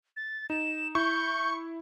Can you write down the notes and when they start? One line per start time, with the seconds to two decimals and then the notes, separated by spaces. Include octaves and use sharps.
0.17 A6
0.50 D#4 E7
0.95 E4 C#6 G6